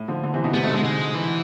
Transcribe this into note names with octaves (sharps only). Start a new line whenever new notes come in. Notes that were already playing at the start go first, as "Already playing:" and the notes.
Already playing: A2
D3 F3
D3 F3
C3 E3
B2 D3
A2 C3 B3
G#2 B2 A3
B2 D3 G#3
G#3
E3